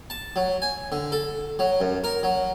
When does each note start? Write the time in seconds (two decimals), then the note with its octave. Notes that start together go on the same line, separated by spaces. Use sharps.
0.10 A5
0.36 F#3
0.62 G#5
0.92 D3
1.12 A4
1.59 F#3
1.80 F#2
2.04 A#4
2.23 F#3